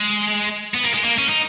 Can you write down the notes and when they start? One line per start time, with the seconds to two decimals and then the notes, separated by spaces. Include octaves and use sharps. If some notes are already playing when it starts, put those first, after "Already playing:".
Already playing: G#3
0.74 B3
0.83 A#3
0.94 G#3
1.04 A#3
1.18 C#4
1.29 D#4